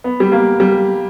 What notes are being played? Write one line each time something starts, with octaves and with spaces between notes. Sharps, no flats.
B3
G3
A#3
G3